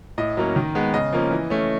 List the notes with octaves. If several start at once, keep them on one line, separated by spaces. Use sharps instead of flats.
A2 D#5
F#3 A#3 C#4
D#3
G#3 B3
C#3 D#5
F3 A#3 C#4
E3
A3 C#4